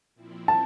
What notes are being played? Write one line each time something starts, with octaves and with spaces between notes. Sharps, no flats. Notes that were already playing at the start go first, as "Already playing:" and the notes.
A#2 F3 C4 E4
A5